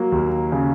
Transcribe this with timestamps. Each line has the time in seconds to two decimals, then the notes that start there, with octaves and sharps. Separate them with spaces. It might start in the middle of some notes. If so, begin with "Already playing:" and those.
Already playing: F#3 A#3
0.12 D#2
0.52 C#3